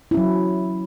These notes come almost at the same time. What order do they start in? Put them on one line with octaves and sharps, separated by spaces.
E4 C#4 F#3